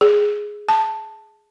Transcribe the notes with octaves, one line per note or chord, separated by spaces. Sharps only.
G#4
A5